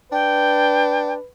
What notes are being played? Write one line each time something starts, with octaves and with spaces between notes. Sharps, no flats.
D4 B4 G5